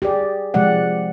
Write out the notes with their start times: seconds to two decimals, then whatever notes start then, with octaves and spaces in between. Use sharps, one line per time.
0.02 G4 G#4 D5
0.54 C3 F3 G#3 G4 D5 F#5